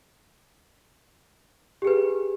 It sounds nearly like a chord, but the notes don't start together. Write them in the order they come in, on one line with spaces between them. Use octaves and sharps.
G4 G#4 B4